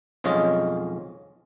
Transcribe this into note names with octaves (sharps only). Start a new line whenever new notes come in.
B1 F2 G#3 C#4 F4 D#5